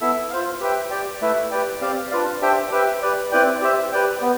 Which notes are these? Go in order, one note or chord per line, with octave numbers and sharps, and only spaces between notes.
B3 E4 A4 E5
F4 C5 F5
G4 B4 E5 G5
G4 D5 G5
A3 E4 B4 E5
G4 B4 D5 G5
C4 G4 D5 F5
D4 F4 B4 D5 F5
D4 G4 C5 E5 G5
G4 B4 E5 G5
G4 B4 D5
C4 E4 B4 D5 G5
G4 C5 E5
G4 B4 D5 G5
B3